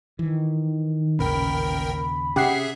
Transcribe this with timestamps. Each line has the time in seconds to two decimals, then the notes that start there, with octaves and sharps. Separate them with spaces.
0.19 D#3 E3
1.19 A1 D#2 A#2 C#3 A#4 G5 B5
2.36 C3 C#4 G4 G#4 E5 F#5 C7